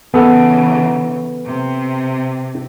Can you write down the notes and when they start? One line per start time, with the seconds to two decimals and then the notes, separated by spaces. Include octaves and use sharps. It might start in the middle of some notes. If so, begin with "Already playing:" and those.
0.14 C#3 E3 B3 A4
1.46 C3